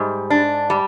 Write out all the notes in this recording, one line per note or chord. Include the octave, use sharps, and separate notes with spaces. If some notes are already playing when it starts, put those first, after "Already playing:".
Already playing: G#2 G3
D4
G3